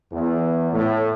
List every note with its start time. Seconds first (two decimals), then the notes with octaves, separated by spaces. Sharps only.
0.12 E2
0.73 A2